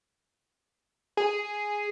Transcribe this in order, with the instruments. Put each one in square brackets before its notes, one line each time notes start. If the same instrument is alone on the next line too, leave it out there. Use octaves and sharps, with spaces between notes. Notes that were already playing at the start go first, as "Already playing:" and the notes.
[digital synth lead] G#4